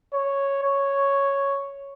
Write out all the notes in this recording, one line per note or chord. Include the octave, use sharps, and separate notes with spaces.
C#5
C#5